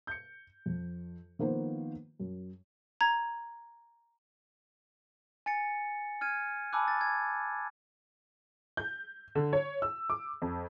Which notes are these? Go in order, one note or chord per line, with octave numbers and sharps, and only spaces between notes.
G6 C#7
F2
D#3 F3 A#3 B3 C5
F#2
A#5 G#6
G#5 A6 C#7
F6 G#6 D#7
G#5 A5 B5 D6 E6 F#6
A6
G#6
G6
D3
C#5
E6
D6
F2